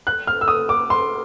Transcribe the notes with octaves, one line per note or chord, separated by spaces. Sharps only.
F#6
F6
E6
D#6
D6
C6